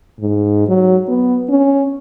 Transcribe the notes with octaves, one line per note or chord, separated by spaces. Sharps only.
G#2
F#3
B3
C#4